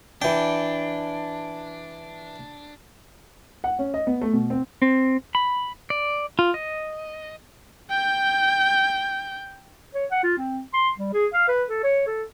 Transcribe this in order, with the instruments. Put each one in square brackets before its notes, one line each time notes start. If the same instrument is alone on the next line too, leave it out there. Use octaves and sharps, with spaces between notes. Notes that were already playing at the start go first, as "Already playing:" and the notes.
[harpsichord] E3 G5 [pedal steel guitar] D4
[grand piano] F#5
C#4
D#5
B3
A3
B2
C4
[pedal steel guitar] C4
B5
D5
F4
D#5
[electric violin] G5 G6
[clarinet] C#5
F#5
F4
C4
C6
G3
G#4
F5
B4
A4
C#5
A4